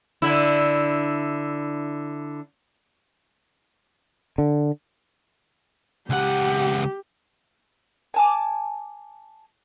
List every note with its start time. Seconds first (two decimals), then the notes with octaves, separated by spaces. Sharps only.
0.22 D3 E4
4.38 D3
6.10 C#2 G4 F#5
8.14 G#5 A5 D6